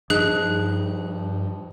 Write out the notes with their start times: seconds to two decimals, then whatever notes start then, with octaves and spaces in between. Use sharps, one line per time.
0.10 G2 F3 D#4 G#4 F#6